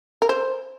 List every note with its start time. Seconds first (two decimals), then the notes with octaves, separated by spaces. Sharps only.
0.22 A#4
0.29 C5